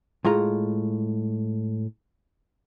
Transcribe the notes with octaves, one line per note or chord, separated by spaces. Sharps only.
A2 G#3 F4 A#5